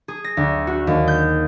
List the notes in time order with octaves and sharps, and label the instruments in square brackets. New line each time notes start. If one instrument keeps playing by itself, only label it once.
[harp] G#4
A#6
D2
F#4
D#2
G6